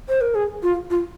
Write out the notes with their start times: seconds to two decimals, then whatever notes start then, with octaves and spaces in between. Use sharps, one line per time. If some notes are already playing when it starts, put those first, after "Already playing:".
0.09 C5
0.21 A#4
0.35 G#4
0.63 F4
0.90 F4